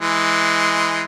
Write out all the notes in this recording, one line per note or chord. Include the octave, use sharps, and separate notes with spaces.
E3 G#3